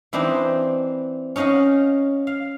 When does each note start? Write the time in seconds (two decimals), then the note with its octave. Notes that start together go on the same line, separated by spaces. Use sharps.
0.13 E3 C4 D4 D#4 C5
1.36 C#4 D#4 D#5 F5 F#5
2.27 F5